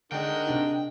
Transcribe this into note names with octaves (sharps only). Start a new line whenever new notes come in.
D3 D#3 G#3 D4 A#4 F#5 G5
C3 D4 D#4